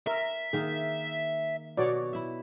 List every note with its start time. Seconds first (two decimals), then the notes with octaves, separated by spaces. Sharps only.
0.07 A#4 E5
0.53 D#3 A#3 G#4
1.77 B2 F#4 C#5 D5
2.13 E4 E5